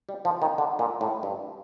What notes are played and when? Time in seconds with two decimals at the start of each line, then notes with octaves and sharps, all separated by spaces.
0.09 G3
0.25 F3
0.42 D#3
0.58 D3
0.79 A#2
1.01 A2
1.23 G2